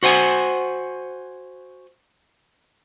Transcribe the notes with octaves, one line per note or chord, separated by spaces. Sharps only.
F#4 C5 F#5 G#5